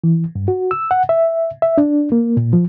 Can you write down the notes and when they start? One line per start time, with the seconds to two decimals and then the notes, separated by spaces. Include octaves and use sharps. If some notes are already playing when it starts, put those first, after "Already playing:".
0.04 E3
0.35 G2
0.48 F#4
0.71 E6
0.91 F#5
1.09 E5
1.62 E5
1.78 D4
2.12 A#3
2.37 A#2
2.53 F3